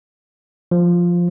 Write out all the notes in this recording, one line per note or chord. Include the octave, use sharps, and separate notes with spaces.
F3